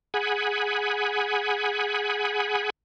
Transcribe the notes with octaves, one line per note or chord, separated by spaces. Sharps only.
G#4 F#5 G#5 B5